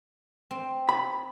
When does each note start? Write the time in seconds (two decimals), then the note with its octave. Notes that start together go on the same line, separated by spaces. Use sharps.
0.51 C4
0.89 B5